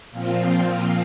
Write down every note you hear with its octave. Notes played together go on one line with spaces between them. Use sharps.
A#2 F3 C4 F4